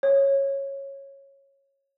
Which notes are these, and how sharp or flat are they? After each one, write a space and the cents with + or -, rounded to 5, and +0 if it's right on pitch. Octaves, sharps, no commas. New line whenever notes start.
C#5 -15